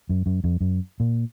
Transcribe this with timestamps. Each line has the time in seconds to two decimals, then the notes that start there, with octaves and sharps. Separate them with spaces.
0.09 F#2
0.26 F#2
0.44 F2
0.61 F#2
1.00 A#2